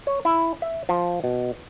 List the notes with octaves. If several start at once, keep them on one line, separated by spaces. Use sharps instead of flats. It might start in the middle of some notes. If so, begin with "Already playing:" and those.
C#5
E4
E5
F3
B2